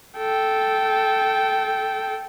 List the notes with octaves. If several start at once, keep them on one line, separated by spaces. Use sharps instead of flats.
A4 G5